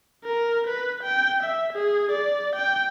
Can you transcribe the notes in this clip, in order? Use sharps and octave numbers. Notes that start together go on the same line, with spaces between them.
A#4
B4
G5
E5
G#4
D5
G5